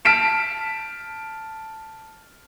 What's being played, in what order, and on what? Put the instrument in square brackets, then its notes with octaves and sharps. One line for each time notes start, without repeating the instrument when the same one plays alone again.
[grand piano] A5 F6 B6 D7 E7